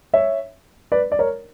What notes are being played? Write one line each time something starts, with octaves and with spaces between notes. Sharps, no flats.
C#5 E5
B4 D5
D5
A#4 C#5